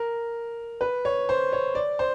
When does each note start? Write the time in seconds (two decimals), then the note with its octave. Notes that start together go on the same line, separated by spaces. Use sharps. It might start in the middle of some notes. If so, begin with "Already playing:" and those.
Already playing: A#4
0.81 B4
1.05 C#5
1.29 C5
1.53 C#5
1.75 D5
1.99 C5